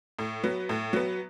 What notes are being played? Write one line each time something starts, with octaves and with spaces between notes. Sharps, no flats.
A2
F#3 B3
A2
F#3 B3